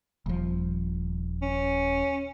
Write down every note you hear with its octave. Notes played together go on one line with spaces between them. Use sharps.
D#1 F3
C#4